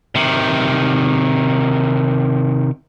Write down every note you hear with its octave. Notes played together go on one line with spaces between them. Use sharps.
C3 D#3